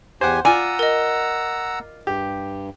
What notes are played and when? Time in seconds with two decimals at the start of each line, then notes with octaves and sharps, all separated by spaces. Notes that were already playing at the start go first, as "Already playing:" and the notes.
0.21 E2 G4 C5 F#5 G#5
0.45 F4 D5 F#5 G#5 A#5 E6
0.79 A#4 D#5
2.07 G2 G4